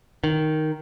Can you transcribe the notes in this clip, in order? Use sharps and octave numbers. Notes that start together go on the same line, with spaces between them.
D#3